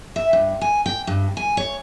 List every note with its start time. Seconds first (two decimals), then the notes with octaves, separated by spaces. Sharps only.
0.16 E5
0.33 G2
0.61 G#5
0.86 G5
1.07 G2
1.37 G#5
1.57 C#5